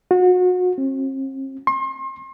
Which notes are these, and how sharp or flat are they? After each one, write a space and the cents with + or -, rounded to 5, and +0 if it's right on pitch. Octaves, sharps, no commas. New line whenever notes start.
F#4 -30
C4 +40
C6 +40